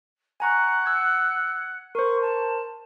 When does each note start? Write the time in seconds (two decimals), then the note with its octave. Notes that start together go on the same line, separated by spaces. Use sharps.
0.40 F#5 G#5 A#5 C#6
0.86 E6 G#6
1.95 A#4 C5 C#6
2.22 A5